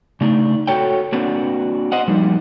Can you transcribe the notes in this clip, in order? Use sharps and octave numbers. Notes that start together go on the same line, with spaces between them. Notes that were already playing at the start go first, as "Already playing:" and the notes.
C#3 A3 D4 D#4
F#4 A4 C#5 G5
A#3 C4 D4 F#4 B4
C5 D#5 F#5
F3 G3 A#3 D#4